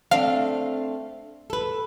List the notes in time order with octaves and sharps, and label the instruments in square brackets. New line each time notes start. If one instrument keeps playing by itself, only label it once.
[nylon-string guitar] A3 C4 D4 [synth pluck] F5
[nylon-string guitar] A4 B4